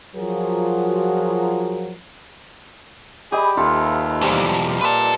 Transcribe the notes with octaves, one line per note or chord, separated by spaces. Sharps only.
F3 F#3 F4 F#4 G#4 A#4
G3 G4 G#4 D#5 B5
D#2 A3 F4 A4 B4
B1 E2 F3 G3
A#2 B4 A5